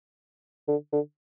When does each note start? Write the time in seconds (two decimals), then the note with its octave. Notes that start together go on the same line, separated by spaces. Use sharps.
0.68 D3
0.92 D3